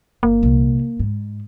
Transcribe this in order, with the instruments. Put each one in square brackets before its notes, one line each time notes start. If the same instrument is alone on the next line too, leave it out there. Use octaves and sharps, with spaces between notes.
[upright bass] G1 [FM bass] A#3
[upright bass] C2 A#2
G#2